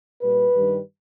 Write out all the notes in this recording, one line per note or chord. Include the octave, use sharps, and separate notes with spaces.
A#2 G3 B4
G2 D#3 G3